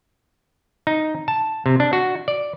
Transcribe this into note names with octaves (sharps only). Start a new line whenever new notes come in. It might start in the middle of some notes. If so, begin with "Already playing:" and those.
D#4
A5
C3
D4
F#4
D5